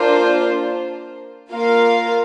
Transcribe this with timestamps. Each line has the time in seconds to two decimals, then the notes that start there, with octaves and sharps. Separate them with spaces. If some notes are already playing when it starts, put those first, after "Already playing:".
Already playing: A#3 D4 F4 C5
1.51 A#3 F4 A#4 F5